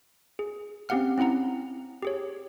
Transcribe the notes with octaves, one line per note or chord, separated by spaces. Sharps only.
G#4
C4 C#4 G4 F5 F#5 F6
C4 C#4 E4 F#5 A#5
G4 G#4 C#5